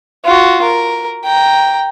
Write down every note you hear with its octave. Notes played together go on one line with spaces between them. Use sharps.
F4 F#4
A#4
G5 A#5